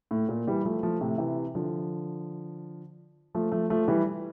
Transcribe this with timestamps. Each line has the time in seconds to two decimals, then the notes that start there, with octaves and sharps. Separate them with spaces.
0.11 A2
0.29 A#2
0.47 E3 G3
0.65 F3 A3
0.83 F3 A3
1.01 A2 C3
1.18 C3 E3
1.55 D3 F3
3.35 F3 A3
3.52 F3 A3
3.70 F3 A3
3.88 E3 G3